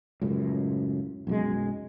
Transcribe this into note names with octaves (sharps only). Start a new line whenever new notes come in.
C#2 F#2 A2
B1 F#2 G#3